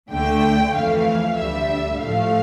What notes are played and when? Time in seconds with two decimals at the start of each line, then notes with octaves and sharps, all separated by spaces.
0.11 D2 D3 A3 G5
0.74 F2 E3 A3 F5
1.37 D2 D3 G3 E5
1.99 A2 F3 A3 F5